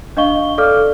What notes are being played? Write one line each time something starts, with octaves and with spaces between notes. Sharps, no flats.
D4 D#5 F5 C#6 G7
A4 D5 F5 D6 F6